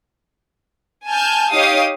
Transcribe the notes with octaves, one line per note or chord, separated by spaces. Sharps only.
G#5 A5 F6 G6
D#4 G4 C#5 F5 D#6